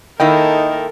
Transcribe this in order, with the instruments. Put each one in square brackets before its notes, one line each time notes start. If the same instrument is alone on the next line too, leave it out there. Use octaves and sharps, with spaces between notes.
[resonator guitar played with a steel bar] D#3 A#3 E4 [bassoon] D#4 [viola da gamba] A4 A#4 [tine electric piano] G5